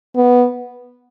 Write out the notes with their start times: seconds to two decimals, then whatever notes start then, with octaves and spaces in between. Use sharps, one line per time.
0.16 B3